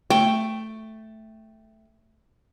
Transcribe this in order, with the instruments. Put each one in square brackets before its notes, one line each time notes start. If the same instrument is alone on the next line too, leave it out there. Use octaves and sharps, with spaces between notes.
[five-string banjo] A3 [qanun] G5